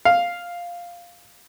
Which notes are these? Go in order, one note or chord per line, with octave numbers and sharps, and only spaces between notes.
F5